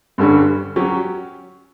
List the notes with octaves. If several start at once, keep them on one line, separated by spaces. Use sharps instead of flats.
G2 D3 G3 C#4
F#3 C#4 G4